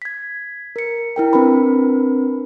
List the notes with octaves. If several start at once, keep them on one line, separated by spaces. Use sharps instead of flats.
G#6 B6
A#4 C#7
E4 A#4 G5
C4 D4 A#4 B4 B5